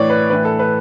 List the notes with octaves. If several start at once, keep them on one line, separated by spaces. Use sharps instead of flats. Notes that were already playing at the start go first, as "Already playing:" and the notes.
Already playing: A2 E3 C#5 D5
B4
A2 E3 B4
A4
B4